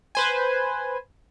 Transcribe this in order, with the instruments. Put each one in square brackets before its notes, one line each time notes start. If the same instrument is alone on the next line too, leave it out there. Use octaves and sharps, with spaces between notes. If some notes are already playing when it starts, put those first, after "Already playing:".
[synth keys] B4 C5 G#5